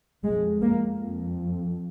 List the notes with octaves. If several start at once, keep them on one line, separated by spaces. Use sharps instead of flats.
F2 G#3
A#3
F2